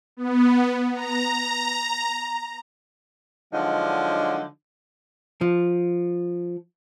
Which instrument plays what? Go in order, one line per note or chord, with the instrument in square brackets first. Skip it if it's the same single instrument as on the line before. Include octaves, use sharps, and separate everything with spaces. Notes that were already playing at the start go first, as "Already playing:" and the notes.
[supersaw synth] B3
A#5
[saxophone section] D3 F3 F#3 G#3 D4 D#4
[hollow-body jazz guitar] F3